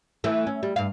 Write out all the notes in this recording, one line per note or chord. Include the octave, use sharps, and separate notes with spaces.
E3 A3
C#4
G3
G2 F5